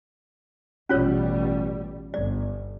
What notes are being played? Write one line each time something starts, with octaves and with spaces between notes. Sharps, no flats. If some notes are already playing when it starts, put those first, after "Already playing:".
A1 B2 G3 C#4 F4 C#5
G1 D5